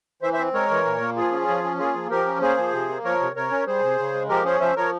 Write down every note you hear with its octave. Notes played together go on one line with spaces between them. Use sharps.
E3 C5 E5
C5 E5
C4
G#3 A#4 C#5
E3
A#2
A#3
F3 F4 G#4
C#4
F3
C#4
A#3 F4 G#4
F3
F3 G4 A#4
C#4
A#3 G#4 C5
F3
C3
A#3
F3 A#4 C#5
C3
C3 A#4 C#5
C#4
G3 G#4 C5
C3
C#3
G#3
F3 G4 A#4
C#4 G#4 C5
F3 C5 E5
F3 A#4 C#5